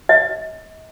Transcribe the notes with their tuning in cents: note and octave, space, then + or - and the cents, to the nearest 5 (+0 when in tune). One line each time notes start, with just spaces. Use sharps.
D#5 +40